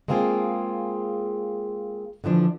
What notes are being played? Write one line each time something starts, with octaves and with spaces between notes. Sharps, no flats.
G#3 A#3 C4 F4 G#4
D3 E3 F3 D4